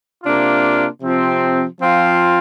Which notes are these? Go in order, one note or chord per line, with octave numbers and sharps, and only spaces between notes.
C3 A#3 D4 F4
C3 F3 C4
F3 C4 F4